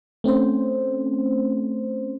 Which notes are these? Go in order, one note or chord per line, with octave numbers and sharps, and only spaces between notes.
A3 C4 C#4 C5